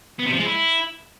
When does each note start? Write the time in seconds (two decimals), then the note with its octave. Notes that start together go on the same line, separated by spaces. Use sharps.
0.19 B3
0.26 C3
0.33 F3
0.39 G#3
0.46 E4